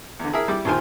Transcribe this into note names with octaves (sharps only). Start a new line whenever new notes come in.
E2 D3
E4 G#4 A#4 E5
G3 E4 D6
A#1 D#2 D#3 F4 C5 G#5